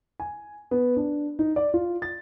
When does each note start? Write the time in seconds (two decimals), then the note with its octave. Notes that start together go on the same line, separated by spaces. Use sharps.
0.20 G#5
0.71 B3
0.96 D4
1.39 D#4
1.56 D5
1.74 F4
2.02 A6